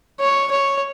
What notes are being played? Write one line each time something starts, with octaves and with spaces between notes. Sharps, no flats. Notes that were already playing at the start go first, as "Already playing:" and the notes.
C#5
C#5